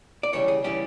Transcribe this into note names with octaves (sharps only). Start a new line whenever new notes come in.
D5
C#2 C#3 E3 G3 C#5
G#4
C#3 E3 G3 G4